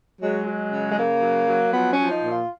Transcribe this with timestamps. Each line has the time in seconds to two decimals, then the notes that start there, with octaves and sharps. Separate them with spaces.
0.22 F#3 G#3
0.47 F#3
0.71 C#3
0.90 G#3
0.96 C#3 A#3
1.22 F#3
1.48 F#3
1.72 F3 B3
1.92 C#4
1.98 F3
2.10 D#4
2.23 A#2
2.30 F4